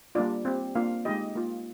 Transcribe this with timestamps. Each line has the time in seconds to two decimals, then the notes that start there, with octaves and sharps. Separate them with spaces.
0.15 G3 A#3 D4 F4 D5
0.45 C4 G4
0.75 A#3 D4 F4 F5
1.05 G#3 D#4 G4 D#5
1.35 A#3 F4